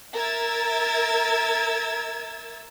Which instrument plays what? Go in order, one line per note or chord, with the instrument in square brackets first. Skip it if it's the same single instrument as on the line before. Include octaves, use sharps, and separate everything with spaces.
[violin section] A#4 E5 E6 G#6 A6